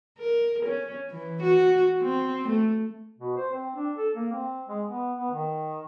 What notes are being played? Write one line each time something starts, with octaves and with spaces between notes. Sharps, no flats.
A#4
C#4
E3
F#4
C4
A3
B2
C5
C4
D4
A4
A#3
C4
G#3
B3
B3
D#3